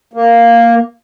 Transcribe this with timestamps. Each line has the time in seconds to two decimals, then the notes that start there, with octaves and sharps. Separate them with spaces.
0.13 A#3